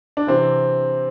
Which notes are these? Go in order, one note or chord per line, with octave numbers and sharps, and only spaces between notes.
D4
C3 E3 C4